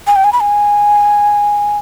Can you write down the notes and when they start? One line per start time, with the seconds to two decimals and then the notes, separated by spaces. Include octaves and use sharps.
0.07 G#5
0.16 G5
0.24 G#5
0.33 B5
0.41 G#5